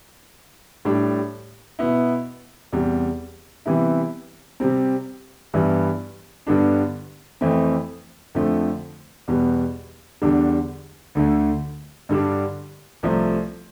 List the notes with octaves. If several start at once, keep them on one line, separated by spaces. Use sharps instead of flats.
A2 G3 D4
B2 B3 E4
E2 C3 G3
C3 E3 G3 B3 E4
C3 G3 C4
G2 E3 G3 B3 E4
G2 D3 G3 B3 D4
F2 E3 A3 C4
F2 D3 F3 A3
E2 B2 G3 B3
E2 D3 G3 D4
D2 D3 A3
G2 D3 G3 D4
C2 C3 F3 A3